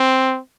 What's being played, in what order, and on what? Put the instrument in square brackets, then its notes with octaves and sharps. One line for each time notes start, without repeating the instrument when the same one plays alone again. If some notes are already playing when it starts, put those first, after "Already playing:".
Already playing: [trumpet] C4